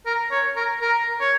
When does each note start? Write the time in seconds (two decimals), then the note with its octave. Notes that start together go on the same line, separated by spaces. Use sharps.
0.06 A#4
0.31 C#5
0.56 A#4
0.82 A#4
1.21 C#5